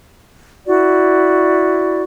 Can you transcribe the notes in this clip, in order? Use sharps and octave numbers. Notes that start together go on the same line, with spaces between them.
E4 F#4 D5